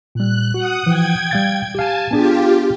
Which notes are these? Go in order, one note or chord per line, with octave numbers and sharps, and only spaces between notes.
A#2 G3 F#6
F#4 F#5 D#6
E3 F3 G5 G#6
G3 F5 A6
G4 F5 G#5 A5
B3 D4 F4 G4 G#4